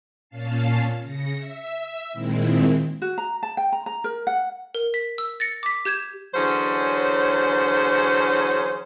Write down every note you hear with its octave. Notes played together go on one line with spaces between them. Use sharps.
A#2 C#4 F5 A5 C7
C#3 A#6 C#7
E5
A#2 D#3 G#3 C4 E4
F#4
A#5
A5
G5
A#5
A#5
A#4
F#5
A#4
B6
E6
A6 A#6 C#7
D6 B6
G4 G6 G#6 E7
D3 E3 F#3 C#4 G#4 C5